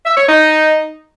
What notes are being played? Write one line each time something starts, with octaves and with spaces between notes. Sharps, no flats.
E5
C#5
D#4